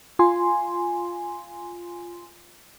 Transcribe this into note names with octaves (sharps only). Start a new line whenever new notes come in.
F4 G#5 C6